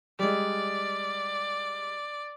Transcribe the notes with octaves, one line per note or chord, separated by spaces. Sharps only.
G3 G#3 D5